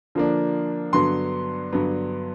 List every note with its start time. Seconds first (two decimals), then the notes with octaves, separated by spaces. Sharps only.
0.15 D3 F3 A#3 D4
0.93 G2 D3 F#3 B3 C6
1.73 G2 D3 F#3 B3